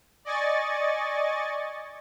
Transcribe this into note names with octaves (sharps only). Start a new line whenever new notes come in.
D5 D#5 G#5 C#6 A6